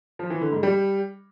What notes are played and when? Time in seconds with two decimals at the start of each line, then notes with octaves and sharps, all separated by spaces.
0.19 F3
0.30 E3
0.41 D3
0.52 G#2
0.63 G3